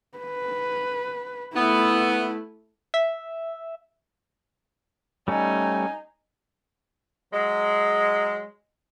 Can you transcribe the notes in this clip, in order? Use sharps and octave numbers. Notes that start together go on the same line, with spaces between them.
B4
A3 B3 E4
E5
G3 A3 C#4 D#4 G#5
F#3 G#3